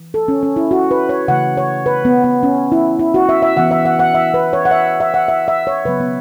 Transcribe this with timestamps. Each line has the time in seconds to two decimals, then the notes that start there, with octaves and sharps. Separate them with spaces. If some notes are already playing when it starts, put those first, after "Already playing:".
Already playing: E3
0.14 A4
0.28 C#4
0.43 C#4
0.56 E4
0.71 F#4
0.91 B4
1.09 C#5
1.28 C#3 E3 A3 F#5
1.57 C#5
1.86 B4
2.05 B3
2.24 B3
2.43 C#4
2.72 E4
2.99 E4
3.14 F#4
3.29 E5
3.42 E5
3.57 E3 B3 F#5
3.71 E5
3.85 F#5
3.99 F#5
4.14 E5
4.34 B4
4.53 C#5
4.65 F#5
4.71 E5
5.00 E5
5.14 F#5
5.28 E5
5.48 E5
5.67 C#5
5.85 C#3 F#3 B3 B4
6.00 B3